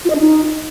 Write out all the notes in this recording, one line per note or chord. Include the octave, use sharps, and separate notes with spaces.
F4
D#5
D4
D#4